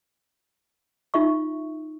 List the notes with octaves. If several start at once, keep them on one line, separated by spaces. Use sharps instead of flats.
D#4 F4 E5 C#6